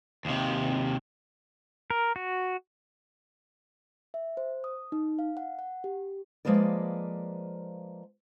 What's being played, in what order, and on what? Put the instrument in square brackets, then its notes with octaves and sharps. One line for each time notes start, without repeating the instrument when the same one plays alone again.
[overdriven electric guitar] D#2 C3
[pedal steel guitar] A#4
F#4
[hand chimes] E5
C5
D#6
D#4
F5
F#5
F#5
G4
[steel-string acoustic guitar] F3 G#3 A#3 B4 D5